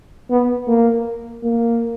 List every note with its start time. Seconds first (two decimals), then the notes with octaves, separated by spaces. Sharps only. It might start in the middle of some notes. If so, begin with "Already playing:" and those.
0.30 B3
0.68 A#3
1.43 A#3